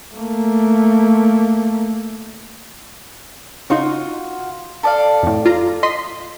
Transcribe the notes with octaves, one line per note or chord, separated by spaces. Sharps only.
A3 A#3
C#3 D#4 F4 F#4
A4 D5 F5
F2 A2
F4 A#5
D#5 C6 B6